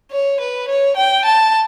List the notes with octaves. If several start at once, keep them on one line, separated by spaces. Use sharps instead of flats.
C#5
B4
C#5
G5
A5